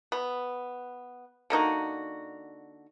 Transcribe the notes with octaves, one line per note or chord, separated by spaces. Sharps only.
B3
D3 A#3 D#4 F#4